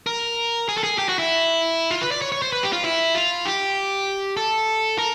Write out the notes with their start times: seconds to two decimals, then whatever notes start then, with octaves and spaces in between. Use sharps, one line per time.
0.07 A#4
0.69 G#4
0.78 A4
0.83 G#4
0.98 G4
1.09 F#4
1.19 E4
1.91 F4
2.01 B4
2.12 D5
2.22 C#5
2.32 C#5
2.42 C5
2.53 B4
2.63 G4
2.73 F4
2.84 E4
3.15 F4
3.45 G4
4.37 A4
4.98 A#4